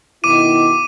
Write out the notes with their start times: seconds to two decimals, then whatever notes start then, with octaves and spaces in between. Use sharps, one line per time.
0.24 B2 D#3 E4 D6 D#7